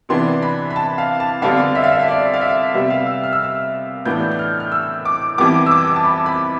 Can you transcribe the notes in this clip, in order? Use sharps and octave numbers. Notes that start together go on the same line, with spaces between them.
C3 E3 B3 D4 C6
B5
B5
A5
F5
A5
F2 D3 G3 B3 D4 F5
E5
F5
E5
E5
D5
F5
E5
C3 G3 B3 E5
F5
E6
F6
E6
F6
A2 E3 B3 D4 G6
G6
F6
F6
E6
D6
F2 E3 G3 B3 D6
E6
D6
A5
B5
B5